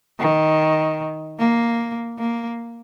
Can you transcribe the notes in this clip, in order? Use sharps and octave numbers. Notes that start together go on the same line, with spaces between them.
D#3
A#3
A#3